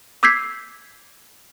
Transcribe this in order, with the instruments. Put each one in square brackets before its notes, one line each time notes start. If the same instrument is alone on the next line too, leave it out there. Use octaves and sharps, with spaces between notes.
[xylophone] D6 E6 G6 G#6 B6 C7